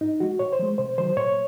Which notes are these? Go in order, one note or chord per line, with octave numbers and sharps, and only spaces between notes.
G#2 D#4
F3 G#3 F#4
A#2 C#5
C5
F3 G#3
C3 C5
D#3 F#3 C5
A#2 C#5